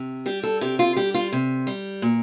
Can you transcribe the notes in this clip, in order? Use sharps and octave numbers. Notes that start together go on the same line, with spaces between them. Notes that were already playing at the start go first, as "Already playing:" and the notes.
Already playing: C3
G3 G4
A4
C3 G4
F4
G3 G4
F4
C3
G3
A#2